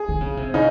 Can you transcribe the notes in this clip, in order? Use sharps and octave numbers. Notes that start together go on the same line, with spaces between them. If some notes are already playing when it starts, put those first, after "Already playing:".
Already playing: G#4
D3
C#3
C3
C#3 D#4